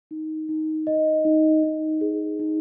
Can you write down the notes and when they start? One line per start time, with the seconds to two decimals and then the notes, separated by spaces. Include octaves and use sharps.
0.11 D#4
0.49 D#4
0.87 D#5
1.25 D#4
1.63 D#4
2.01 G#4
2.39 D#4